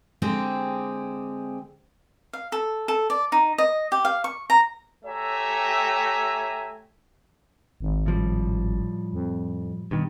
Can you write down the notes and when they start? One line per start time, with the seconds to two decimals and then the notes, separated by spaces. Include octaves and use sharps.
0.22 D3 G#3 C4 G4 G#4
2.33 F5
2.52 A4
2.88 A4
3.10 D5
3.32 D#4
3.58 D#5
3.92 G4
4.05 F5
4.24 C#6
4.50 A#5
5.05 A3 G4 C#5 E5 G#5 A#5
7.81 G#1
8.06 A2 F3 G3
9.13 F2
9.91 G2 B2 D#3